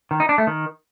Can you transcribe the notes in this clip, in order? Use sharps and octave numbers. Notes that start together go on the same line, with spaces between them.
D#3
D#4
D4
A3
D#3